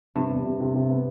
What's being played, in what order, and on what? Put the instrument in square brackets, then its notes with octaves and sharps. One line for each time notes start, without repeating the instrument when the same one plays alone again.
[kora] G2 [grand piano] C3
[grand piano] E2
C3
C3
C3
B3